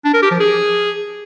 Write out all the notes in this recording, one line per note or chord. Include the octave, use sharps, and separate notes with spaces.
D4
A#4
G4
F3
G#4